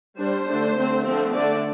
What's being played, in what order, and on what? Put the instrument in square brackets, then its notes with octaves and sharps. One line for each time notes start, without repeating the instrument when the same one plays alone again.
[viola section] G3 D4 C5
D3 A3 D4
D3 A3 C4
D3 F3 A3 C4
D3 A3 D4 D5